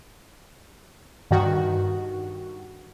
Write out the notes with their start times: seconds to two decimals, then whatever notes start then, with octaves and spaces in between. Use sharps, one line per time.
1.31 G2 D#3 F#4